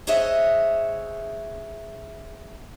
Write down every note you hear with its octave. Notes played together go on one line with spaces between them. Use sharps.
G#4 C5 C#5 D#5 E5 F#5